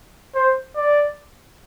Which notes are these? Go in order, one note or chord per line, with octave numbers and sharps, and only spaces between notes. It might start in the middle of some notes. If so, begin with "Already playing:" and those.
C5
D5